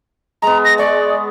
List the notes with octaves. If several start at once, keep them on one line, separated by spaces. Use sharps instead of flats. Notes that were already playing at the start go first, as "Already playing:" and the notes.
G#3 B3 A#5
A#6
G#3 D5 C#6